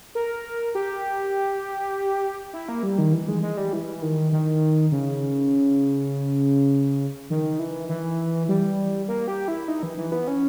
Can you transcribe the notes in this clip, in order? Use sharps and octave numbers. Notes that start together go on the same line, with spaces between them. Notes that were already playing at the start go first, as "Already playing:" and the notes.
A#4
G4
E4
A#3
G3
D#3
E3
G#3
G#3
G3
E3
D#3
D#3
C#3
D#3
E3
E3
G3
A#3
G4
E4
D#4
E3
E3
B3
C#4